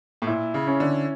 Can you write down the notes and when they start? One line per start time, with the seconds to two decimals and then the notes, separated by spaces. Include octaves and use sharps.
0.22 A2
0.27 A#2 E4
0.54 C#3
0.67 C#4
0.80 D3